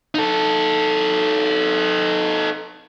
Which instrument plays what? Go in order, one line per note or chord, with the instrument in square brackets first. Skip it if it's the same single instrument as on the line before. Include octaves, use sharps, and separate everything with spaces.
[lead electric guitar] D#4 A4